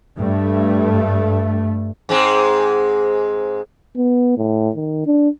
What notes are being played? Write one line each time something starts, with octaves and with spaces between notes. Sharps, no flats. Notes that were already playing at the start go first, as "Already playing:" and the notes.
G2 A3
G#2 G#3 C4
B3
A2
D#3
D4